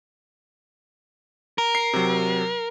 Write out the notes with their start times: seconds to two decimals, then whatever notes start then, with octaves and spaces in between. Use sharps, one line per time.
1.58 A#4
1.75 C7
1.93 C3 F#3